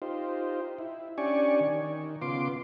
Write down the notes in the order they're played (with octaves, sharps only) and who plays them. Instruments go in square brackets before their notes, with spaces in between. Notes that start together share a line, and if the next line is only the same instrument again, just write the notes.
[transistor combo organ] D#4 F4 G4 C5
E4
C#4 D4 G4 D5 G#5 C#6
D#3
C#3 B3 F4 C6 D6